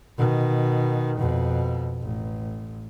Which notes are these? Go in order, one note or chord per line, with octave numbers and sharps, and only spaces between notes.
B2 D#3
F2 B2
A1